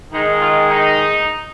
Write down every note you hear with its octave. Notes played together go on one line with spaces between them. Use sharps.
D#3 G#3 D#4
F4
D#4